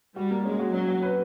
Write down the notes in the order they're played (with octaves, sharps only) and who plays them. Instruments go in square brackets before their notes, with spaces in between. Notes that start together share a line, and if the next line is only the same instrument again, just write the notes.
[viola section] G3 [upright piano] F#4
[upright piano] A#3
[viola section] G#3 [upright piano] C#4
[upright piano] F#4
[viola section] F#3 [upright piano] C#4
[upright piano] F#4
B4